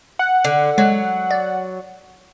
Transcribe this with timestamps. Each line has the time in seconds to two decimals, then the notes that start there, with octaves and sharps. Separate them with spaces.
0.19 F#5
0.44 D3
0.78 F#3 G#3
1.31 D5